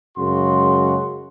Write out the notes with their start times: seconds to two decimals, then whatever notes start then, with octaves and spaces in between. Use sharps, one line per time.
0.17 F#2 C#3 G#3 F#4 C6